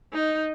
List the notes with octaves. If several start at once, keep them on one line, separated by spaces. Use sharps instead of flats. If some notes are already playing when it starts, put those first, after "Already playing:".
D#4